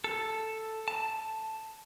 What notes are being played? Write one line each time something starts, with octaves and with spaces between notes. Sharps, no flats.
A4
A5